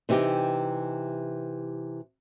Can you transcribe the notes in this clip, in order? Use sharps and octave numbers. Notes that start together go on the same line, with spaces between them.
C3 E3 D#4 G4